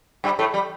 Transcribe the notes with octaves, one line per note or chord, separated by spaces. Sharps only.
G2 G3
A2 A3
G3